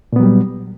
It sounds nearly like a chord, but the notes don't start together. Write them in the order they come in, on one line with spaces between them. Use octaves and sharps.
A#2 B3 F#3 G3